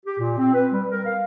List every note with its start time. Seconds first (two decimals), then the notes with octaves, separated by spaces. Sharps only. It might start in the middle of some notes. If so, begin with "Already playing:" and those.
0.05 G4
0.19 A#2
0.38 C4
0.54 B4
0.71 G3
0.89 A#4
1.05 F5